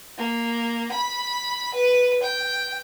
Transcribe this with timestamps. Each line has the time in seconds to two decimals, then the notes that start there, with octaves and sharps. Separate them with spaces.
0.18 A#3
0.92 B5
1.74 B4
2.22 G5